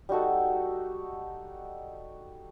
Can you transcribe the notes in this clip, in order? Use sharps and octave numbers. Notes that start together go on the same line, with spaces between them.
G3 D#4 F#4 A4